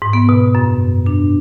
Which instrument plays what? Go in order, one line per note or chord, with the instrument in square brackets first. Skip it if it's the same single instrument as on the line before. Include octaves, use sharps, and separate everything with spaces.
[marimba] G#2
B3
B2
F#2
D4